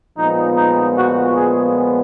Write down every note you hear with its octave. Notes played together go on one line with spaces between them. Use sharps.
A#2 F3 G#3 B3 D#4
D#4
F#4
G#4